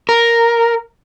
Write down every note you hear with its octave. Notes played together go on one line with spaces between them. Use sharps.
A#4